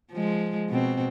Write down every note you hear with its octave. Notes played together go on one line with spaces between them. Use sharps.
F3 G#3
B2 C4